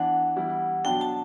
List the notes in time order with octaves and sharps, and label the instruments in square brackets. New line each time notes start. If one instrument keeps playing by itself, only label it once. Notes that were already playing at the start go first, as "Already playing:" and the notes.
Already playing: [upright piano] E3 B3 D4 [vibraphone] F#5
[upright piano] E3 G3 B3 E4
[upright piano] B2 F#3 B3 D4 [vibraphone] G5
[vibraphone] A5